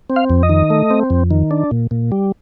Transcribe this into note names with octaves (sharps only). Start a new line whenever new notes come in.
C4
F5
F2
D#5
D#3
A3
C4
F2
D#3
D4
A#2
A#2
G3